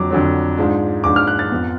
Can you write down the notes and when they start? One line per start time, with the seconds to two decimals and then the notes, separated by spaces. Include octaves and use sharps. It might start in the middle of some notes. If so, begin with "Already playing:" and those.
Already playing: F2 D3 F#3 D6
0.11 F2 D3 F#3
0.58 G#2 F3 G#3 D4
1.04 G#2 F3 G#3 D4 D6
1.16 F6
1.27 F#6
1.39 A6
1.52 F2 F3 B3